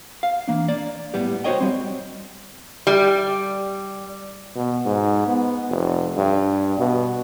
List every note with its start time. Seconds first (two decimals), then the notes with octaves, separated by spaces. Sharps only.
0.23 F5
0.48 E3 A#3 D4
0.69 A#3 D5
1.14 A2 G3 B3 G4
1.44 F#4 A4 C5 C#5 D#5 G5
1.60 G3 C4
2.87 G3
4.56 B2
4.86 G#2
5.27 B3
5.70 F1
6.17 G2
6.79 B2